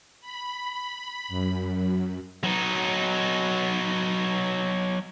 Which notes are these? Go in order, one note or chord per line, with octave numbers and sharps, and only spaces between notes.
B5
F#2
F#3 D#4